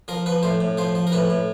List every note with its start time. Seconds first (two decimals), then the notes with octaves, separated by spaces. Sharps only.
0.08 F3 A#4
0.26 F3 B4
0.43 A2 C5
0.61 A2
0.77 F3 C5
0.95 F3
1.07 A#4
1.12 A2 B4
1.30 A2